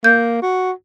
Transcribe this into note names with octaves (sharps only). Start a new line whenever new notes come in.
A#3 G6
F#4